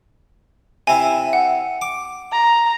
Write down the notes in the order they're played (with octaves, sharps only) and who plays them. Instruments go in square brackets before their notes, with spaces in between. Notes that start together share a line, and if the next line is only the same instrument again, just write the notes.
[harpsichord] C3 E4 [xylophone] G#5
[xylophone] F#5
[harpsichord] D6
[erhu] A#5